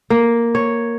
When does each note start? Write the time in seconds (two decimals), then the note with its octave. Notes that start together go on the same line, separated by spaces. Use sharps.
0.10 A#3
0.55 C#5